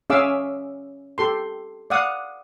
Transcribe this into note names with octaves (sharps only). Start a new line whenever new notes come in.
C#4 G#4 E5 F5 D6 E6
G4 A4 C6
D5 F5 F#5 D#6